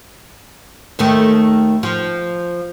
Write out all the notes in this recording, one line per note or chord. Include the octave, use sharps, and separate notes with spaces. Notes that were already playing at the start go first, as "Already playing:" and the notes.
D#2 D#3 A3
F3